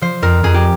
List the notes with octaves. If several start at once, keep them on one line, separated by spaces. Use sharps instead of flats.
F3 C5
F2 A#4
F2 G#4
G4